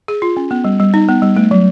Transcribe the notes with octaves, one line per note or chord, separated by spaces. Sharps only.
G#4
F4
C#4
B3
G3
G3
D#4
B3
G3
A3
F#3